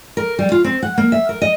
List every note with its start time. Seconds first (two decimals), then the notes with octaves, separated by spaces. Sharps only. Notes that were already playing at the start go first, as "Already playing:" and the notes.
0.17 A#4
0.39 G3
0.52 F4
0.64 C4
0.83 F#5
0.98 A#3
1.12 E5
1.29 A#4
1.42 D#5